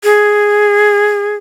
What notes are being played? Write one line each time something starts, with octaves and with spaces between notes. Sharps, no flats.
G#4